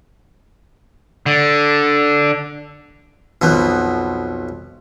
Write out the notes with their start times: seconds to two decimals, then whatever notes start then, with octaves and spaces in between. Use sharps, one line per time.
1.26 D3
3.42 B1 F2 B2 B3